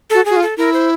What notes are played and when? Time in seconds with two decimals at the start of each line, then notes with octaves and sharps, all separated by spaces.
0.10 F#4 A4
0.25 F#4 G#4
0.36 F4
0.42 A4
0.57 E4 A#4
0.74 C5